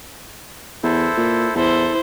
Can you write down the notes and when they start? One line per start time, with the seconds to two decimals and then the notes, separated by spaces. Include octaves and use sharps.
0.84 E2 E4 A4 C5
1.17 A#2
1.56 E2 E4 A4 C5